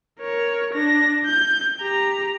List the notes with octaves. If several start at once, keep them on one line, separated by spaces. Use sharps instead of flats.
A#4 C#5
D4 A#6
G6
G4 A#5